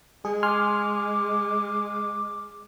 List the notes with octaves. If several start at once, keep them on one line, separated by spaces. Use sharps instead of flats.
G#3 G#4
G#5 C6 D6 F6